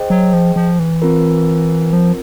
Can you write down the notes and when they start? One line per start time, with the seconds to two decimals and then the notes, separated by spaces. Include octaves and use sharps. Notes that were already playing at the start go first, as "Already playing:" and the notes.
Already playing: G#4 C5 D#5 G5
0.10 F#3
0.33 F3
0.56 F3
0.79 E3
1.02 C4 F4 A#4
1.93 F3